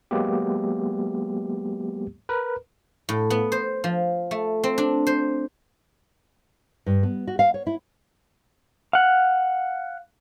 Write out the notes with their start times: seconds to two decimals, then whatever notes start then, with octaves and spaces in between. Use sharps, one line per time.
0.11 F#3 G#3 A#3 B3 G4
2.29 A#4 B4
3.09 A2
3.30 B3
3.52 C5
3.84 F3
4.31 A3
4.64 C4
4.78 D4
5.07 C5
6.86 G2
7.03 B3
7.27 F#4
7.39 F5
7.54 C#5
7.67 E4
8.93 F5 F#5